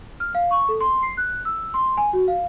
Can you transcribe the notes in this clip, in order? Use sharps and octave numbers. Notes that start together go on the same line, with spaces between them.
F6
F5
C#6
A4
C6
C7
F#6
E6
C6
G#5
F#4
F5